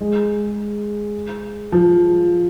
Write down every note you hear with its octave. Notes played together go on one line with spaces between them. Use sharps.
G#3
F3